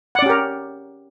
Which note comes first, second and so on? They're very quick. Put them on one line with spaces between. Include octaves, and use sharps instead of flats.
F#5 D5 C#4 G4 A#4